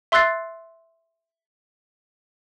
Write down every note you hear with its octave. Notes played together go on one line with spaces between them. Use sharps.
E5 C6 E6 F#6 A6 C7